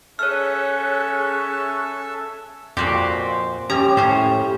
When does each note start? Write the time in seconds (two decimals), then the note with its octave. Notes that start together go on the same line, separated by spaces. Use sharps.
0.19 C#4 G#4 A4 C#5 E5 A5 F6 F#6
2.77 F2 A#2 F#4 G4 C6
3.70 F3 C#4 G4 A#5
3.97 A2 C#4 C5